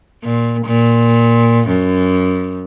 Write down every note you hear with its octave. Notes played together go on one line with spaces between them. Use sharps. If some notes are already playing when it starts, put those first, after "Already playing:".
A#2
A#2
F#2